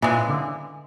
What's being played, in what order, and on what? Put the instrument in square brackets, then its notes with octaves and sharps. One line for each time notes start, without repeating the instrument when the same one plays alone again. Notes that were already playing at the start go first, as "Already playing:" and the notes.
[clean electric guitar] A#2 [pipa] C#3 E3 G#3
[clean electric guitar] D3